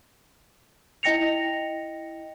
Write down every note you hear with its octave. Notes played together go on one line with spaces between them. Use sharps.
E4 D#5 G5 A#6 C#7 F7